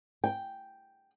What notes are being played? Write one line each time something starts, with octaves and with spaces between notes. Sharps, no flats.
G5